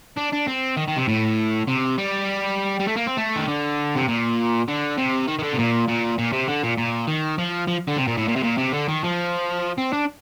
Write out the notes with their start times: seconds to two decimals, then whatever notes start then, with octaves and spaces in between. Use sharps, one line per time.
0.17 D4
0.32 D4
0.47 C4
0.77 D#3
0.88 D#3
0.97 C3
1.08 A2
1.67 C3
1.98 G3
2.80 G3
2.88 A3
2.97 A#3
3.07 C4
3.18 A3
3.36 D#3
3.48 D3
3.96 C3
4.08 A#2
4.68 D3
4.98 C3
5.28 D#3
5.39 D#3
5.43 D3
5.53 C3
5.58 A#2
5.88 A#2
6.18 A#2
6.33 C3
6.48 D3
6.64 A#2
6.78 A#2
7.07 D#3
7.38 F3
7.67 F3
7.88 D3
7.98 C3
8.07 A#2
8.18 A2
8.28 A#2
8.36 C3
8.43 A#2
8.58 C3
8.73 D3
8.88 D#3
9.04 F3
9.78 C4
9.93 D4